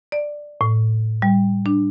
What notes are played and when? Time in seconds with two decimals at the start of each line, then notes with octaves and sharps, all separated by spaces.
0.12 D5
0.61 A2
1.22 G3
1.66 D4